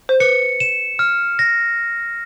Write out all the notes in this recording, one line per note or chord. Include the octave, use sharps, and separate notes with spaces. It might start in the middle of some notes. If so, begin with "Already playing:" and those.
C5
B4 C#7
E7
F6
A#6